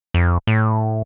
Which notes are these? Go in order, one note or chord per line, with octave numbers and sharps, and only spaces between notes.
F2
A2